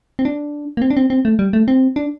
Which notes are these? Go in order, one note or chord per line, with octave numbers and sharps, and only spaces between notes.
C4
D4
A#3
C4
D4
C4
C4
A3
G3
A3
C4
D4